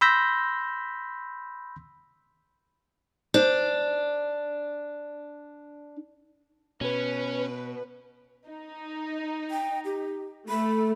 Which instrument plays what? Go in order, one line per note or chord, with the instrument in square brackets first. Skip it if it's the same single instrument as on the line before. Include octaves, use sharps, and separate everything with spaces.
[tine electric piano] B5 C6 E6 G6 A#6 B6
[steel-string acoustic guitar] D4 [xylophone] C5
[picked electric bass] B2 [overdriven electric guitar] C#4 [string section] B4
[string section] D#4
[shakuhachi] G5
G4
[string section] A3 [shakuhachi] B5